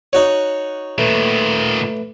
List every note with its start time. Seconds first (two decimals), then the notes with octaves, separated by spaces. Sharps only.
0.13 D#4 F#4 C#5
0.98 A#2 D#3 A3 B4